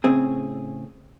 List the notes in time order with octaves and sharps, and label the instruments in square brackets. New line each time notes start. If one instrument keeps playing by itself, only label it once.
[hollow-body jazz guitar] A2 C#3 C4 G#4